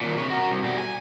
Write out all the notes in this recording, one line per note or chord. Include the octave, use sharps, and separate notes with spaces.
D#2 A#2
C3 C#5
F#4 A#4
C2
B2 G3
G#5